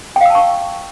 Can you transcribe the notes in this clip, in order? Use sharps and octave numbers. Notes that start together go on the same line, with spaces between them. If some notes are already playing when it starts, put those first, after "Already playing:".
F5 G5 A5 C#6 E6